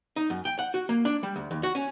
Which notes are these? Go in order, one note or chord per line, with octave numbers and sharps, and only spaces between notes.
D#4
F#2
G5
F#5
F#4
A#3
D4
G3
D2
D#2
F#4
C#4